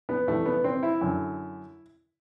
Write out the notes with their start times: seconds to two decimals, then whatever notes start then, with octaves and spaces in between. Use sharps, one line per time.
0.09 B3
0.27 C2 C3 E3 A3
0.46 B3
0.64 C4
0.83 E4
1.01 F#2 D3